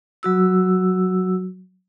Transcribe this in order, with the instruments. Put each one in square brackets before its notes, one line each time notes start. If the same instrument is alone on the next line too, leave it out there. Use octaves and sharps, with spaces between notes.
[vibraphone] F#3 F#4 E6